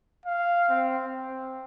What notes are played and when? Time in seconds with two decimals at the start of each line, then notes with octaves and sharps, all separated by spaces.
0.26 F5
0.69 C4
1.06 C4